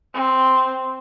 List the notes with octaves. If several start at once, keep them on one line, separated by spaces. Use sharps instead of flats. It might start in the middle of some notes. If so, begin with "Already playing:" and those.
C4